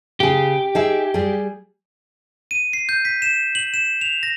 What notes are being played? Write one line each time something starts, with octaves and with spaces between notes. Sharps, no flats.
C#3 G4 G#4
D#4 G#4 E5
G3 G#4
D#7
C7
G6
B6
E7
F#7
E7
F7
A#6